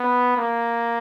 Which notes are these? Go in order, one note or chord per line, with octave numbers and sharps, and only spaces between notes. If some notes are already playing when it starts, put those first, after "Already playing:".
Already playing: B3
A#3